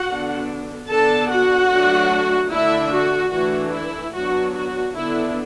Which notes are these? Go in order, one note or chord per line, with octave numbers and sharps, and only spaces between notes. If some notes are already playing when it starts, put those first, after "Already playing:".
Already playing: F#4 F#5
D3 B3 D4
D3 B3 D4 A4 A5
F#4 F#5
F#3 A3 D4
D3 A3 D4 E4 E5
F#4
E3 A3 D4 F#4
E4
F#3 B3 D4 F#4
F#4
D3 B3 D4 E4